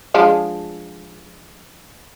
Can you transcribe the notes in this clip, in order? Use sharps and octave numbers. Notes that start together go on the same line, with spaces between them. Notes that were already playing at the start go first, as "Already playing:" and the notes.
F3 G#3 D4